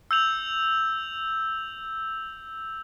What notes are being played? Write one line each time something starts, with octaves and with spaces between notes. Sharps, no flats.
E6 G6 F7 F#7